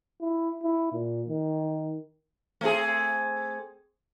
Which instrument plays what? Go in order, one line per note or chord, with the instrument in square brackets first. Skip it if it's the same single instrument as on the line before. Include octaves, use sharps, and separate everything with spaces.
[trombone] E4
E4
A#2
D#3
[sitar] A3 C4 G#4